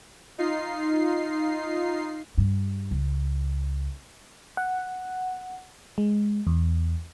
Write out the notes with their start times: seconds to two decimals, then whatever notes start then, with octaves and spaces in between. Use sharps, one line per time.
0.38 D#4 F4 C7
2.38 G2
2.91 C#2
4.57 F#5
5.98 G#3
6.47 E2